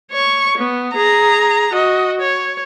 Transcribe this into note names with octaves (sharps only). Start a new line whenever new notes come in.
C#5 C#6
B3
G#4 A#5
F#4 D#5
C#5